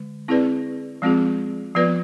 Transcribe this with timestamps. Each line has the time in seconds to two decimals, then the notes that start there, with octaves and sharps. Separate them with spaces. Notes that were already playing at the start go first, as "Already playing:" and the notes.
Already playing: D3 G#3
0.28 C4 E4 G#4 B4 D5
1.02 F3 G#3 C4 F4 G#4
1.75 F3 B3 F4 B4 D5